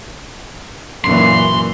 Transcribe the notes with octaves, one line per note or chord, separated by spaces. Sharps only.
F#2 A#2 E3 C6